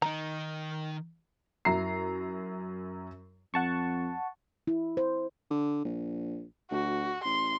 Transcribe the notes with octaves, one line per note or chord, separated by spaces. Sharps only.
D#3 D#4 A#5
F#2 E4 A#5 C7
F2 F#5 A5 C#6
E4
C5
D3
A#1
D2 F#4
A1 C6